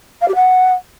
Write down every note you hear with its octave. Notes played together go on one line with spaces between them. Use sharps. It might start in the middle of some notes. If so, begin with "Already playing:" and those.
F5
G4
F#5